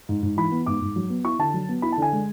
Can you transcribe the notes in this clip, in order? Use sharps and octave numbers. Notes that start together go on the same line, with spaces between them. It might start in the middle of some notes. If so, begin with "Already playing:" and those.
G#2
G#2
E3 B5
B3
G#2 D6
G#2
F#3
B3
E4 C#6
D3 A5
F#3
B3
E4 B5
A5
D3 G#5
G#3